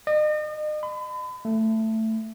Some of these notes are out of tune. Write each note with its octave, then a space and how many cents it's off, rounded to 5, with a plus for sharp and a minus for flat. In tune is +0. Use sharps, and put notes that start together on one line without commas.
D#5 -40
B5 +40
A3 +10